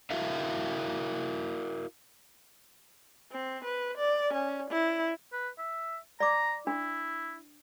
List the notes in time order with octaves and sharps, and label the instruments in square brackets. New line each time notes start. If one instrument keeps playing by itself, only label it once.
[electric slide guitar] E4 F#4 A#4 E5 F5
[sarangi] C4
B4
D5
C#4
E4
[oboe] B4
E5
[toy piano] D5 D6 [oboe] A#5
[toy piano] D4 [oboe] E4